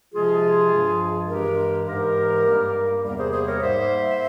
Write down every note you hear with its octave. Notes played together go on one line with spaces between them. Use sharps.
C3 F3 G#3 F4 G#4
G2 F3 G#3
G2 E3 G#3 G4 A#4
G#2 E3 G#3 G4 A#4
G2 G3 A#3
E2 C3 G3 A#3 A#4
G#4 C5
G#4 C5
A#4 C#5
G#2 G3 A#3 C5 E5